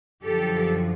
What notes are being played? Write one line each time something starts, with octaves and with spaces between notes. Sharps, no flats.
F#2 D3 F3 G4 A4